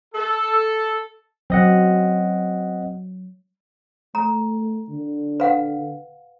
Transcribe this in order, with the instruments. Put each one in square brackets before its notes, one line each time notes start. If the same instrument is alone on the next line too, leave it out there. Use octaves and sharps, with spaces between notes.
[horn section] A4
[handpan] F#3 [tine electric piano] C4 D#5 F#5
[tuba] A3 [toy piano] A#5
[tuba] D3
[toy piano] B4 F5 F#5